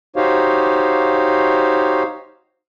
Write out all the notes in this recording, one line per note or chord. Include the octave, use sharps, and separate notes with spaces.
D#4 F#4 G4 C5 C#5 F5